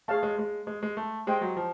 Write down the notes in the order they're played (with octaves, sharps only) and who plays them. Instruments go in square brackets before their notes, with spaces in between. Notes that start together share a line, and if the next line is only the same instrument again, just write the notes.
[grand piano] A3 [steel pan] G#4 C#5 F5 A5
[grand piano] G#3
G#3
G#3
G#3
A3
[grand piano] G#3 [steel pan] G4 C5 D#5 G5
[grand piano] F#3
F3